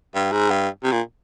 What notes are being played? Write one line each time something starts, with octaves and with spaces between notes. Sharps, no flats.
G2
G#2
G2
C3
A#2